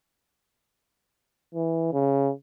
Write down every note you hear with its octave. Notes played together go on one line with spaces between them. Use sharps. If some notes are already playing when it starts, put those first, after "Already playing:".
E3
C#3